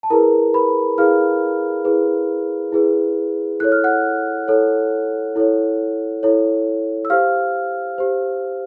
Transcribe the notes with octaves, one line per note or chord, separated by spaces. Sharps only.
A5
E4 G#4 A#4 B4 A#5
B4 B5
E4 G#4 B4 F5 F6
E4 G#4 B4
E4 G#4 B4
E4 A4 C#5 F#6
F6
F#5 F#6
E4 A4 C#5
E4 A4 C#5
E4 A4 C#5
E6
G4 C5 F5 F6
G4 C5